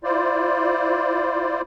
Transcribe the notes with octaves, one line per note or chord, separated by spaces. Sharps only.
E4 F4 C5 D5